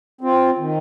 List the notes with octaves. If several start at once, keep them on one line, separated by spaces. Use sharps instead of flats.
C4 F4
D#3